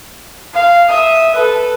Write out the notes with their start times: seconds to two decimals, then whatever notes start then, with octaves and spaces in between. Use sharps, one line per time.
0.54 F5
0.90 E5 D#6
1.35 A4 B4